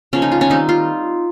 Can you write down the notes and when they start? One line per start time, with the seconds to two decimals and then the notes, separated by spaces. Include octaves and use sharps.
0.13 C#3 F3 A#3 C#4
0.22 D#4
0.32 F4
0.41 C#4
0.50 D#3 G3 C4 D#4
0.69 F4